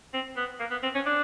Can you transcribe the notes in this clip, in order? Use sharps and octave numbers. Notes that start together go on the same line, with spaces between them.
C4
B3
A#3
B3
C4
C#4
D4